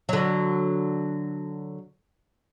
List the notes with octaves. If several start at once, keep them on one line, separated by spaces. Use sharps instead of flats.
D3 F#3